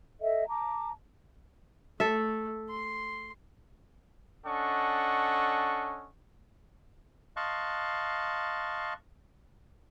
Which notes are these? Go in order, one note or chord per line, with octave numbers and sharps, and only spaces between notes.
A4 D#5 E5
A5 A#5 D6
A3 A4 E5
C6
C#4 D4 A4 D#5 F#5 C#6
D#5 F5 A5 C6 C#6 F#6